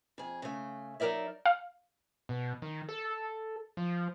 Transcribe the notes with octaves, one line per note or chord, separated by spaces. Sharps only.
F2 G#4
C#3 A3
F#3 D#4 A#4 D5 E5
F5
B2
D#3
A4
F3